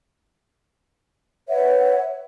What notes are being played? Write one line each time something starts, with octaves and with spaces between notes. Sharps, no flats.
B4 C#5 E5 F#5